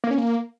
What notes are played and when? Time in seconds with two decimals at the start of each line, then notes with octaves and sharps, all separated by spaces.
0.04 A#3
0.11 C#4
0.18 A#3